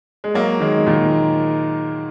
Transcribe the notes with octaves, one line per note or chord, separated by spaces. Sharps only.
G#3
F#3 A#3
D#3 G#3
A#2 D#3